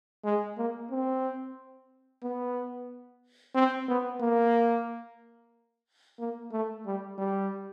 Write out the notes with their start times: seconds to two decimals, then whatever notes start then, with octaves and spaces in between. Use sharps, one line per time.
0.24 G#3
0.58 A#3
0.91 C4
2.23 B3
3.55 C4
3.88 B3
4.21 A#3
6.19 A#3
6.52 A3
6.86 G3
7.18 G3